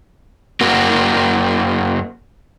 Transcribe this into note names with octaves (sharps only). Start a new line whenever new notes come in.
F#2 F#3 A#3 F#4